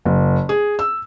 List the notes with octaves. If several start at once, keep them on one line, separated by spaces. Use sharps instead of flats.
F#1
G#4
E6